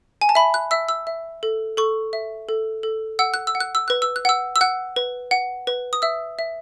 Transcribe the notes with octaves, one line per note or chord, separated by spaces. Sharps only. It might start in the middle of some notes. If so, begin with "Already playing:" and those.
G#5
A5
E5 B5
F#6
E5 E6
E6
E5
A4
A4 C#6
E5
A4
A4
F#5 E6
F#6
E6
F#5
F#6
E6
B4 F#6
E6
F#6
F#5 E6
E6
F#5 F#6
B4
F#5
B4
D#6
E5 E6
E5